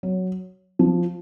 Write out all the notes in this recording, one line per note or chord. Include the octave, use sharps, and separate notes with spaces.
F#3
F3